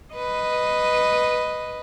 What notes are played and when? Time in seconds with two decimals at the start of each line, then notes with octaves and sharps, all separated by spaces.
0.14 B4 D#5